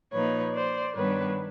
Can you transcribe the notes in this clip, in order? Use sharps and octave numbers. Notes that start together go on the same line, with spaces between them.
A#2 F3 A#3 D#4 B4 C#5
C5 D5
G2 D#3 G3 B3 D4 B4 C#5